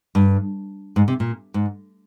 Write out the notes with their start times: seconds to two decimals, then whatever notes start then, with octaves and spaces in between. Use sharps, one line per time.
0.15 G2
0.96 G#2
1.08 C3
1.20 A#2
1.54 G#2